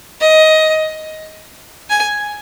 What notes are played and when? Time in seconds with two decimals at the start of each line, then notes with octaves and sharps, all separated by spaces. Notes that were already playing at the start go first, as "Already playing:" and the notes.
0.21 D#5
1.90 G#5